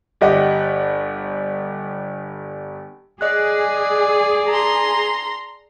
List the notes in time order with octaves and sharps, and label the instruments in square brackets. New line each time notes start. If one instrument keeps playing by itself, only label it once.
[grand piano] G1 G4 D#5 F#5
[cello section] G#4 [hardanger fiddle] D5 [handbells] D#5 F#6
[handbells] A5 [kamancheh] A#5 C6